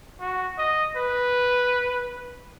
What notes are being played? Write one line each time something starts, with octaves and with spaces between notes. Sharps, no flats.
F#4
D#5
B4